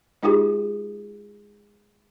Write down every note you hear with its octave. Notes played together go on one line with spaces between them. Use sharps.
G#3 D#4 F4 G4 G#4